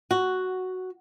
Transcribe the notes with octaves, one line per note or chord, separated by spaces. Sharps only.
F#4